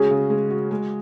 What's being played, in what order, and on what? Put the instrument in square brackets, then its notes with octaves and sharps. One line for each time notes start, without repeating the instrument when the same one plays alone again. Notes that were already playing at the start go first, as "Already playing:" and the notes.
Already playing: [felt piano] C#3 G#3 C#4 F#4 [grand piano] G#4
[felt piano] C#3
G#3
F#4
G#3